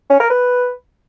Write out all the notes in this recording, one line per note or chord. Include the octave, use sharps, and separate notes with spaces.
C#4
A#4
B4